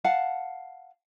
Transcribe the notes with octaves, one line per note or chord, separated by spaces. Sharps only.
F5 F#5 A5